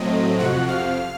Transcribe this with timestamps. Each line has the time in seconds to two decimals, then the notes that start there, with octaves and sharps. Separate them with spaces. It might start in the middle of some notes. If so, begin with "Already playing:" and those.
Already playing: A2 F#3 A3 C4 D#5
0.39 F2 C3 F3 F#4 F#5
0.69 F5 F6